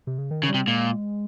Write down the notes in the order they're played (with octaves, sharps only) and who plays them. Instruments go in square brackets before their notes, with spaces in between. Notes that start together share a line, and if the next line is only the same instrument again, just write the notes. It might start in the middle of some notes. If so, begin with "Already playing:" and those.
[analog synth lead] C3
C#3
D#3
[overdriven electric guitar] C#3
[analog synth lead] G3
[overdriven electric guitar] C3
[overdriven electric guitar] A#2 [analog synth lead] G#3